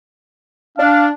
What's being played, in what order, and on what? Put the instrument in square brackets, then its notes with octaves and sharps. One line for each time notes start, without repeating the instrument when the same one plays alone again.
[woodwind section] D4 [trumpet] F5